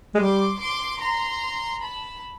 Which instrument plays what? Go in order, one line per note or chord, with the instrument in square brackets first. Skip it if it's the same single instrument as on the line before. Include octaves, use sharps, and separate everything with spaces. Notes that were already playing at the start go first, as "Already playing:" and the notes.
[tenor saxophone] G#3
[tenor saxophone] G3 [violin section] C6 D6
[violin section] C6 D6
A#5 C6
A5 B5